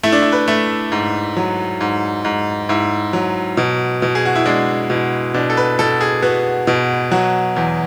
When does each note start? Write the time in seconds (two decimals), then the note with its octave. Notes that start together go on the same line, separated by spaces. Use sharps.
0.03 A3 E4
0.12 D4
0.22 E4
0.32 B4
0.48 A3
0.92 G#2
1.37 F#3
1.81 G#2
2.25 G#2
2.69 G#2 E4
3.13 F#3
3.57 B2
4.02 B2
4.15 G#4
4.25 F#4
4.36 E4
4.46 G#3 D4
4.90 B2
5.34 B2 D4
5.50 A4
5.57 B4
5.79 B2 A4
6.01 G#4
6.22 B3 F#4
6.67 B2
7.11 F#3 F#4
7.56 E2